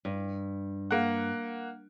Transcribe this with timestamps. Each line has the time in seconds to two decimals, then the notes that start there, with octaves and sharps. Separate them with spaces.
0.05 G2
0.91 A#3 F#5